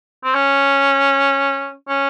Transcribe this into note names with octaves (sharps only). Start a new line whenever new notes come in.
C4
C#4
C#4